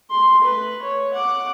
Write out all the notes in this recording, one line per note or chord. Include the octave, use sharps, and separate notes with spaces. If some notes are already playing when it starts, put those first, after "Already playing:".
C6
A3 B4
C#5
F#5 D6